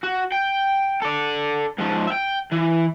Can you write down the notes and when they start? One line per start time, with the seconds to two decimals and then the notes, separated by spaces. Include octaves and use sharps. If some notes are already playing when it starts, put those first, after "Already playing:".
0.03 F#4
0.32 G5
1.02 A4 D5
1.79 G#2 F3
2.08 E5 G5
2.52 E3